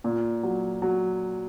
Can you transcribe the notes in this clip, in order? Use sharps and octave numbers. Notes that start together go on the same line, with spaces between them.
A#2
F#3
F#3